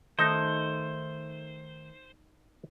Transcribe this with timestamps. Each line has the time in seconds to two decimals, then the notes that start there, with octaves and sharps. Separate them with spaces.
0.19 D#3 A3 D#4 A4 C5